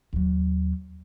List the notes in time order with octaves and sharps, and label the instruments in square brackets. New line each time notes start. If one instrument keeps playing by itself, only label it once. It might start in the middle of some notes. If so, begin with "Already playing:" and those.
[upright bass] D#2 F#3